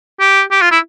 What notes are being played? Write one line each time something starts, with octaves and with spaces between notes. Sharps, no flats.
G4
G4
F4
E4